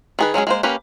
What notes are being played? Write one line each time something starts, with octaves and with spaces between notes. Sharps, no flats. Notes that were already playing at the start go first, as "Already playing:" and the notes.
D#3 G#4 B4
F#3 G#3 C#4 G#4
G#3 A#3 C5
A#3 C#4 G4 B4